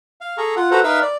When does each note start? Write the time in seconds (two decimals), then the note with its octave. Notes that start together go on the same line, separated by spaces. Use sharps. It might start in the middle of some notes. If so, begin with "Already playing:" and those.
0.21 F5
0.38 G#4 A4 A#5 C#6
0.56 F4 F#5
0.71 F#4 A4 B4 C5 F#5 A#5
0.84 D#4 A#4 B4 E5 F5 E6
1.02 D5